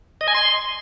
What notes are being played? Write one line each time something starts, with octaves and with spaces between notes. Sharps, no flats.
D#5
G#5
C6